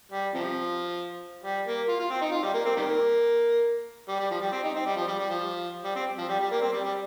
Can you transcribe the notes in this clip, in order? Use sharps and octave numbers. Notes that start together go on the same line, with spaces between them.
G3
C3 F3
G3
A#3
F4
F4
C4
D#4
F4
G3
A#3
C4
D#3 G3 A#3
G3
G3
F3
G3
C4
D#4
C4
G3
F3
G3
G3
F3
G3
C4
F3
G3
G3
A#3
C4
G3
G3